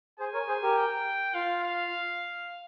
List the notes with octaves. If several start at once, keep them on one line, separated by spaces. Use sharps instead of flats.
G#4 C5 G#5
A#4 C#5
G#4 C5
G4 A#4
G5
F4 F5
F5